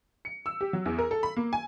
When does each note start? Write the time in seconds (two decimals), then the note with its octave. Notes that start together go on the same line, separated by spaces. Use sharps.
0.25 C#7
0.46 E6
0.61 G4
0.73 F#3
0.86 E2
0.98 A#4
1.11 A4
1.23 B5
1.37 A#3
1.53 G#5